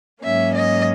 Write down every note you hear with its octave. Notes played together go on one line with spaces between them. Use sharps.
G#2 F#3 A#3 C#4 E5
D#5